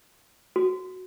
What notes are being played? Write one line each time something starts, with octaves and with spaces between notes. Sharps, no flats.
F#4